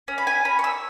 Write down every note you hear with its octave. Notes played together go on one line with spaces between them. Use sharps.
C#4
B5
G#5
C#4 B5
C#6
E6